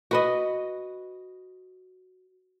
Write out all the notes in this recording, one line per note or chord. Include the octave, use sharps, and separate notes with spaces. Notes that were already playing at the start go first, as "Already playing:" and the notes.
F#4 B4 D#5